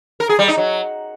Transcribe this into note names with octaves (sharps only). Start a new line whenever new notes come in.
A#4
G#4
G3
D#4
F#3